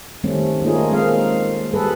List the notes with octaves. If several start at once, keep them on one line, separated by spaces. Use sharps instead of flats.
D#3 G3 A3 C4 C#4
A3 A#3 C#4 D#4 F4 G#4
G#3 A#3 C4 F5
G3 G#4 A4 B4